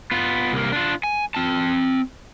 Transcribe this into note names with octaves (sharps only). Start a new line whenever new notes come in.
B3 F4
C2 A#3
D4 F4
G#5
C4 A5